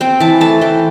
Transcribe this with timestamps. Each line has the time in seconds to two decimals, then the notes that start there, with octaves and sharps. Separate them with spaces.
0.01 C4 G5
0.20 E3 A5
0.41 A3 A5
0.61 E3 G5